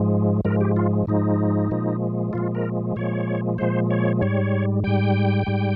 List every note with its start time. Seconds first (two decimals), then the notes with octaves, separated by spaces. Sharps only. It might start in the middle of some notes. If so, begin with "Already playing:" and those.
Already playing: G#2 F3 G#3
0.45 G#2 F3 G#3 A#4
0.60 G4
0.76 F4
1.07 G#2 F3 G#3 D#4
1.71 A#2 F3 G#3
2.33 A#2 F3 G#3 F4
2.55 A#4
2.96 A#2 F3 G#3 C#5
3.58 A#2 F3 G#3 C5
3.90 C#5
4.21 G#2 G3 C#5
4.84 G#2 G3 G5
5.47 G#2 G3